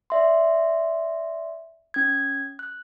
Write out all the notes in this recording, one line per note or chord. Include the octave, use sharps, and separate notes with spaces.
D5 E5 C6
C#4 G#6
F#6